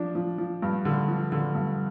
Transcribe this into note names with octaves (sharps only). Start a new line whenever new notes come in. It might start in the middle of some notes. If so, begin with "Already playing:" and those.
Already playing: F3 D4
F3
F3
G2
D3
F3
D3
G2